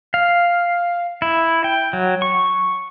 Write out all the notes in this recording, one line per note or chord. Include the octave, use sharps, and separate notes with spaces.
F5
E4
G5
F#3
C#6